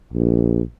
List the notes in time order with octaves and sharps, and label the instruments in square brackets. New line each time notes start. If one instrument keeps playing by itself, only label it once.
[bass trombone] A#1